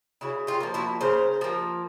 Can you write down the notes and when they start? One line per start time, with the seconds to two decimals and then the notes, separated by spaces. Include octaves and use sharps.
0.21 C#3 E4 F#4
0.47 F4 G4
0.60 F3 A#3
0.74 E4 F#4
1.01 C#3 A#4 C5
1.41 F3 A#3